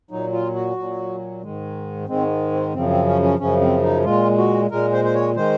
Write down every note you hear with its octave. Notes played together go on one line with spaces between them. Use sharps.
A#2 F#3 D#4
F4
F#4
A#2 F#3
G#2 D#3 G#3
G#2 D#3 G#3 C4
C4
F#2 C#3 F3 C4
C4
C#4
C#4
F#2 C#3 F3 C#4
C4
D#4
A#2 G#3 F4
F#4
A#2 G#3 A#4
C5
C5
C#5
D#3 G#3 C5